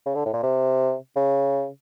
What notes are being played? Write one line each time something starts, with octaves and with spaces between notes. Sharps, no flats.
C#3
D3
A2
A#2
C3
C#3